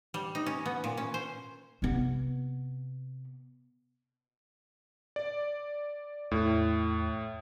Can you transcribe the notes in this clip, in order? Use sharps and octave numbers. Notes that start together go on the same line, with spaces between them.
G3
D#4
C#4
B3
A#2
C#4
C5
C3 B3
D5
E2 A2